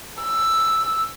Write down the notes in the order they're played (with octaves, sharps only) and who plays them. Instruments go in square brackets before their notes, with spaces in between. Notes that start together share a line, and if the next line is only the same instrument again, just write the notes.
[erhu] E6